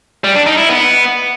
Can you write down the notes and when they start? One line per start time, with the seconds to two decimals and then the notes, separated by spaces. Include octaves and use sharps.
0.24 G3
0.35 D4
0.47 D#4
0.58 E4
0.69 B3